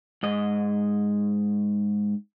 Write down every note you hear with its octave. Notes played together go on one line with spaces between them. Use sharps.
G#2 D#5